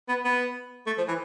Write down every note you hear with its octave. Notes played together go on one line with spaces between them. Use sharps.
B3
B3
A3
F3
E3